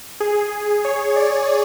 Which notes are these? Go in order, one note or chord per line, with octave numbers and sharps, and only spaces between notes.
G#4
C#5
D5